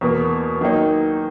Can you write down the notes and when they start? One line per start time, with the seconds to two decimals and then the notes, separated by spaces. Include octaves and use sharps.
0.01 E2 B2 A#3
0.61 D#3 F#3 A#3 D#4